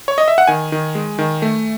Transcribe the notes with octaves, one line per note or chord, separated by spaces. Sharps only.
C#5
D#5
E5
F#5
D#3 G#5
D#3
G#3
D#3
A3